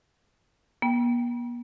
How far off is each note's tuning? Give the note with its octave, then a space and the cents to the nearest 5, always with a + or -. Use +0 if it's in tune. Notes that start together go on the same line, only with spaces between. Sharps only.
B3 -45 G5 +0